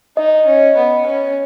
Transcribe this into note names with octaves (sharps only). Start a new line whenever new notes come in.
D#4 D#5
C#4
B3
C#4